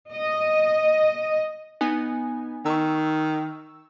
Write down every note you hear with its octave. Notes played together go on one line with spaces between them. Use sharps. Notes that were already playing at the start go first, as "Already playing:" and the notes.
D#5
B3 D#4 G#5
D#3 C#6 E6